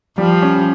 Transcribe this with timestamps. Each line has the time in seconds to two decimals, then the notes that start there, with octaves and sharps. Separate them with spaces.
0.17 F3 G3
0.42 C#4